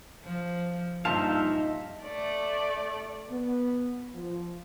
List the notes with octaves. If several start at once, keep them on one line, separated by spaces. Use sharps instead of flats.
F3
G2 A#2 F3 D#4 E5 F5 A5
A3 D5
B3
F3